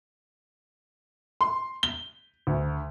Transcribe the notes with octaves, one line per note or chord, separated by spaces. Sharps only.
C6
G7
D2